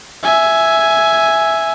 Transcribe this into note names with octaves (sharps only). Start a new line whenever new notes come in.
E5 G#5